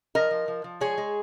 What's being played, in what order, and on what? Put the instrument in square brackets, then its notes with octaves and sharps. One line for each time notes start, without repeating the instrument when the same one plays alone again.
[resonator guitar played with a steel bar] F3 A#4 D#5
F3
F3
F3
G#3 G#4 C#5
G#3